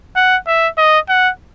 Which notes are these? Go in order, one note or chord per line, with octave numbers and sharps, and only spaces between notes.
F#5
E5
D#5
F#5